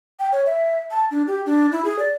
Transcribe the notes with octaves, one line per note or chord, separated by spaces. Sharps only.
G5
C#5
E5
A5
D4
G4
D4
E4
G#4
D5